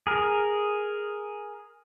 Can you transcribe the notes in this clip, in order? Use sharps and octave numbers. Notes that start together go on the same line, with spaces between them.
G#4 A#4